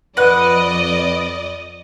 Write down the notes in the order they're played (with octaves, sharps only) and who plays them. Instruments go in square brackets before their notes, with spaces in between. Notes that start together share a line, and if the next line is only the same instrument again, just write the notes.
[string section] F2 D5 D#5 [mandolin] B4 F#5